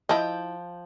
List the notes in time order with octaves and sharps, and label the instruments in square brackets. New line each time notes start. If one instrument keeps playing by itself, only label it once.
[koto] F3 G5 [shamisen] E4 D#5